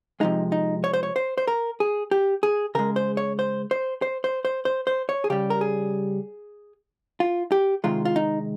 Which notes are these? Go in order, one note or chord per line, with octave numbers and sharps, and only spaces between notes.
C3 F3 G#3 D#4
D#4
C#5
C5
C#5
C5
C5
A#4
G#4
G4
G#4
C#3 G#3 A#4
C5
C#5
C5
C5
C5
C5
C5
C5
C5
C#5
G#4
C#3 G3 G4
A#4
G#4
F4
G4
C3 D#3 G#3 F4
F4
D#4